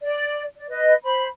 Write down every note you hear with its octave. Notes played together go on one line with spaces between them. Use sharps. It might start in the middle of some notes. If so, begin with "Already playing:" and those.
D5
D5
B4 D#5
C5 B5